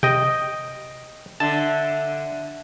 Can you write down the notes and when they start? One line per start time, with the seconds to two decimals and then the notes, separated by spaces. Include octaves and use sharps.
0.03 C3 D#5 G5
1.40 D3 E5 A5